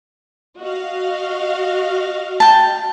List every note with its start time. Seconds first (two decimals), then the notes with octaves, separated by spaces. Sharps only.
0.59 F#4 D#5 F5
2.40 G5 A5